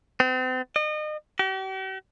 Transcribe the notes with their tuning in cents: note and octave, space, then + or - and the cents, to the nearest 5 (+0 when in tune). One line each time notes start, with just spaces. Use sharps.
C4 -40
D#5 -35
G4 -45